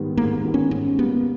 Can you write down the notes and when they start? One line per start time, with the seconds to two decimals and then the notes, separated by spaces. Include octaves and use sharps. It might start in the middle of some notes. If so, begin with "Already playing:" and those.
Already playing: G#2 D#3 G3 B3
0.17 G#2 A#3
0.45 D#3 G3 B3
0.54 C#4
0.71 G#2 C#4
0.99 G3 A#3 B3